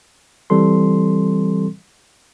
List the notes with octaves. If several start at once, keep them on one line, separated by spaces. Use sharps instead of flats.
E3 G3 C4 A4 C6